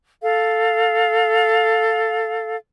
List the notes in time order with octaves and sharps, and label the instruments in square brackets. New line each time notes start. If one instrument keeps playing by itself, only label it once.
[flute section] A4 F5